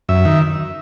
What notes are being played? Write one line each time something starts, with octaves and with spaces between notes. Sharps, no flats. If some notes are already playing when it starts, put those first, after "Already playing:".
F#2 E5
D#3